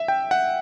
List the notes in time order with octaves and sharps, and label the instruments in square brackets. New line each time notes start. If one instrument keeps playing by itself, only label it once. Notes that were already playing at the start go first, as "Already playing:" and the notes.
Already playing: [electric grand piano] E5
G5
F#5